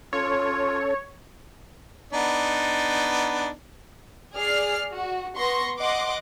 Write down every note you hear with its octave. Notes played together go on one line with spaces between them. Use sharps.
C#4 F4 A4 C#5
B3 D4 D#4
G#4 D5 F6 C7
F#4
B3 C6 C#6 A#6
D#5 F#5 C6 D6